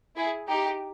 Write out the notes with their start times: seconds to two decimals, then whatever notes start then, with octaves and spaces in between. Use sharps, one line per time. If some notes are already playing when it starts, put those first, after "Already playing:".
0.17 E4 G#4
0.48 D#4 G4